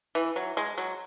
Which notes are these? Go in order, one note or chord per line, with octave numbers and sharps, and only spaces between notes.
E3
F#3
G#3
F#3